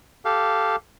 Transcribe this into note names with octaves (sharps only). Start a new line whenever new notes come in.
G4 A4 F5